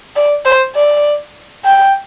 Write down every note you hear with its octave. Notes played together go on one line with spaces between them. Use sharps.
D5
C5
D5
G5